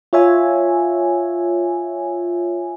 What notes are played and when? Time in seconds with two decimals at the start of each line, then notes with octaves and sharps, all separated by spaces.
0.13 F4 C#5 E5 G#5